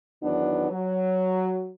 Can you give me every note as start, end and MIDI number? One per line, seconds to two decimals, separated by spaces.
0.23 0.67 40
0.23 0.67 51
0.23 0.67 54
0.23 0.67 59
0.23 0.67 62
0.70 1.71 54